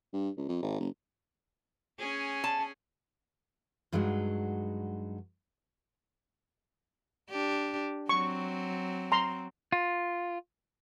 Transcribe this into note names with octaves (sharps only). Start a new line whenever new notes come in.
G2
C#2
F2
G#1
F#1
C#4 G#4
A5
G2 F#3 G#3 D#4 E4 F#4
D4 G4
F#3 C4 C#6
A#5 C6
F4